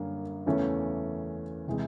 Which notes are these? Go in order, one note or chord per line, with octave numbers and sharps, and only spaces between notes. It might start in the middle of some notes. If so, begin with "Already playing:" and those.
Already playing: F#2 D3 G3 A#3 C#4
E2 C#3 E3 A3 C#4
C3 E3 G#3